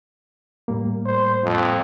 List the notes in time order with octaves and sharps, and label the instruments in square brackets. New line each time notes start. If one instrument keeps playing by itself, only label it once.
[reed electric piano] A2 G3 A#3
[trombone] C5
F2